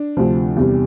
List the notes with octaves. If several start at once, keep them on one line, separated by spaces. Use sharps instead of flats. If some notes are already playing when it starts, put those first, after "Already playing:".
Already playing: D4
D2 C3 F3
E2 C3 G3